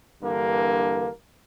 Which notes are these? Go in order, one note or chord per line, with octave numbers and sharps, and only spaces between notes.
G2 D3 E3 A#3